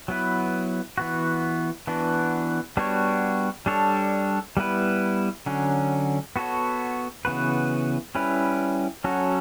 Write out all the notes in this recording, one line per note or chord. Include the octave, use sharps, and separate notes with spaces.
F#3 B3 E4 B4
E3 B3 F#4
E3 B3 D4 F#4
G3 B3 D4 F#4 C#5
G3 D4 A4 C#5
G3 B3 E4 B4
D3 F#3 C#4
B3 F#4 A4 C#5
C#3 E3 B3 F#4 B4
G3 C#4 E4 B4
F#3 C#4 F#4 A4